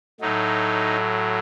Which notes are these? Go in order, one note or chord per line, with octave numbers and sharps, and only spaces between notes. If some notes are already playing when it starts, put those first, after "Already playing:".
A2 F#3 D#4